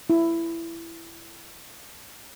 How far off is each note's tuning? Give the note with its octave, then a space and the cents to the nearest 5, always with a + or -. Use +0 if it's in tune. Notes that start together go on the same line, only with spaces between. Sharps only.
E4 +15